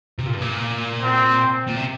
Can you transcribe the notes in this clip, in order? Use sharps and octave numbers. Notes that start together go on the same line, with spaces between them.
C3
A#2
G2
A#2
C4
A#2
C3